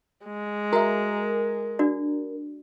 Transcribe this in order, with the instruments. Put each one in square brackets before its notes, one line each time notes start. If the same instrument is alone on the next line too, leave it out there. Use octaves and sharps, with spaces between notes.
[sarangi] G#3
[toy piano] F#4 E5 [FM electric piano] A#4
[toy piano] D4 F#4 D5